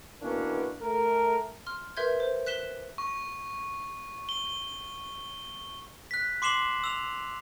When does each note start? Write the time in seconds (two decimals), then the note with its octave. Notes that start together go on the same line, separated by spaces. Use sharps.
0.21 B2 E3 A#3 B3 C#4 D4
0.82 A3 A#4
1.66 C6 F6
1.97 A#4 B4 E5 C6 G6 G#6
2.20 C5
2.46 F#6 B6 E7 G7
2.98 C#6
4.29 G7
6.11 F#6 B6
6.42 C6 D6 C7 E7 F#7 G7
6.84 E6 F7